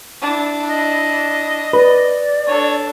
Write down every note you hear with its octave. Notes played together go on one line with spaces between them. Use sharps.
D4 E4
D#5
B4 D5
D4 A4 C#5